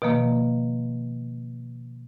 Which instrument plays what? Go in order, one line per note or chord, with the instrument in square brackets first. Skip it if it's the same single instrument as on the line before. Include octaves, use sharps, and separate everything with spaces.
[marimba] B2 D#3 F3 A#3